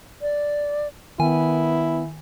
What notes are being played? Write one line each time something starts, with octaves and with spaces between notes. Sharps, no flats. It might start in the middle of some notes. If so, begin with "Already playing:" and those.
D5
D#3 B3 E4 G#5